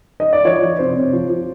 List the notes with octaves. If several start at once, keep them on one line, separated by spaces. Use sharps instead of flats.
D#5
D5
F3 C#5
F3
C3 C5
C3
F3
F3